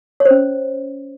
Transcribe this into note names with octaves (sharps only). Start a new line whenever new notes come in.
C#5
C5
C#4